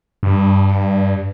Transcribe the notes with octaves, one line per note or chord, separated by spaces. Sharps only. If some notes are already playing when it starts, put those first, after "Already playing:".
G2